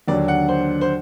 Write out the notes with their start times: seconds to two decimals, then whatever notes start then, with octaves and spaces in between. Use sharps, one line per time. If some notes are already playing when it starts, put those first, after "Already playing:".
0.08 D#2 D3 F#3 D5
0.28 F#5
0.49 C5
0.81 C5